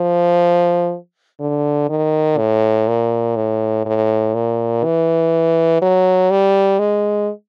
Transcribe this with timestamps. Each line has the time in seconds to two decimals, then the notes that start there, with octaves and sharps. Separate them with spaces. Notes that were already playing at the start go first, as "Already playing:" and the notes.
Already playing: F3
1.41 D3
1.90 D#3
2.38 A2
2.88 A#2
3.36 A2
3.86 A2
4.34 A#2
4.84 E3
5.82 F#3
6.31 G3
6.79 G#3